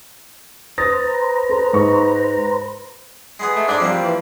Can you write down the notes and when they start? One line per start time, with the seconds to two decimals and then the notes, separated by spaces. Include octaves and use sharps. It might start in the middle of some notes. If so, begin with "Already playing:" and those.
0.78 B4 C5 A#5 D#6 A6 A#6
1.49 A4
1.73 G#2 C#6
3.39 G#3 B3 G#4
3.56 A3
3.68 G#2 G#3 D4
3.80 F3 G3 A#3 C4
4.03 E3